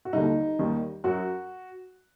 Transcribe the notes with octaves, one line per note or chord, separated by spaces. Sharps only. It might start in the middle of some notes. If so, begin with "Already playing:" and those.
F#4
D#2 D3 G3 D#4
D#2 D#3 G3
F#2 F#3 F#4